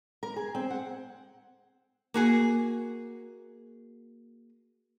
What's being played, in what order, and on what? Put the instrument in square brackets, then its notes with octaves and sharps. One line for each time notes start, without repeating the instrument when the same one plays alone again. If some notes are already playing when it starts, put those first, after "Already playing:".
[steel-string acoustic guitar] A#4
G#4
C4
F#5
[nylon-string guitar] A#3 F#4 G#4